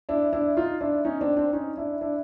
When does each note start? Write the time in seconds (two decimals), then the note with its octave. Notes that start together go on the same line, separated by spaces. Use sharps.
0.09 D4 E4
0.33 D4 E4
0.57 D#4 F4
0.81 D4 E4
1.05 C#4 D#4
1.21 C4 D4
1.37 C4 D4
1.53 C#4 D#4
1.77 D4 E4
2.01 D4 E4